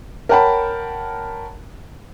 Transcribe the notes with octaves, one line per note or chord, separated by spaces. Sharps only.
A#4 C#5 F#5 G5 A5 B5